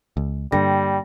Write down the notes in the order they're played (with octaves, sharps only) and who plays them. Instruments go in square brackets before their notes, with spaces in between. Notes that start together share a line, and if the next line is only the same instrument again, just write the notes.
[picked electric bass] C#2
[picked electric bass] G2 D3 [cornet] G3 [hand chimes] A#3 G5 A#6